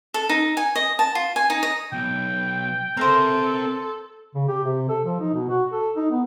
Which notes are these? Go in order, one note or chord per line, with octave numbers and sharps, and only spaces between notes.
A4
D#4
G#5
D#5
A5
F4
G#5
D#4
D#5
B1 G5
C4 A4 A#4 C5 E5
C#3
G4
C3
A4
F3
D#4
B2
F#4
A4
D#4
B3